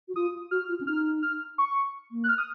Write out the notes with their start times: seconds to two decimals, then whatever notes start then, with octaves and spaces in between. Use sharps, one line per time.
0.08 F#4
0.15 F4 D#6
0.51 F#4 F6
0.69 F4
0.80 C#4
0.87 D#4 F6
1.22 F6
1.58 C#6
2.11 A#3
2.24 F#6
2.29 F6
2.38 D#6